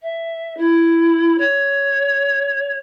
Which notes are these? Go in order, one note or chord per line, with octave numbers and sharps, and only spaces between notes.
E5
E4
C#5